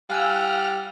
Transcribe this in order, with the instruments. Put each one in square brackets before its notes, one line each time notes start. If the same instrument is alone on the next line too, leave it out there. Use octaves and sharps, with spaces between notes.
[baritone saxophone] G3 [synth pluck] F5 G#5 E6 [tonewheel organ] F#5 F6